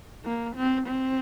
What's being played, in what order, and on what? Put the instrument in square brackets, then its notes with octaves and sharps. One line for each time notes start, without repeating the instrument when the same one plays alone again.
[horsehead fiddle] A#3
C4
C4